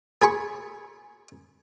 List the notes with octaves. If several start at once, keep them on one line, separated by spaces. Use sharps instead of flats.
G#4 G#5 B5 C#6